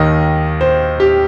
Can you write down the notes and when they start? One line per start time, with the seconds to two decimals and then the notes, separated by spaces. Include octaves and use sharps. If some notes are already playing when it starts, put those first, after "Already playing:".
Already playing: D#2 D#3 D#5
0.61 C5
1.00 G4